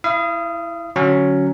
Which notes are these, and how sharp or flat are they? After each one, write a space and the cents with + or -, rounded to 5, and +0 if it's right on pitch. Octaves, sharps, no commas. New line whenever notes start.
E4 +0 F5 -40 D#6 +0
D3 +0 F#3 +0 C#4 +5